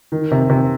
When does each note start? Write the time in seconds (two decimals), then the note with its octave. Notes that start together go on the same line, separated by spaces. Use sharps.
0.12 D#3
0.31 C3
0.49 C3